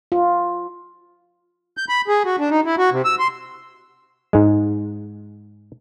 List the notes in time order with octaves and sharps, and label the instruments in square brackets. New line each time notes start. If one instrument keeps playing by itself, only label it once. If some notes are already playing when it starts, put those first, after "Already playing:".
[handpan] F4
[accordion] G6
B5
G#4
F#4
D4
D#4
E4
F#4
C3
E6
C6
[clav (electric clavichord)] G#2 G#3